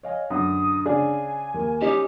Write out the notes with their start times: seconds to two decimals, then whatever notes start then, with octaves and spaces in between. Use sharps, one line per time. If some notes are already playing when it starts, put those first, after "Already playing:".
0.03 C#5 D#5 F5 G#5
0.30 F#2 D3 D#6
0.85 C#3 D4 G#4 G#5
1.54 D#2 A#3
1.81 G3 C#4 D#4 G4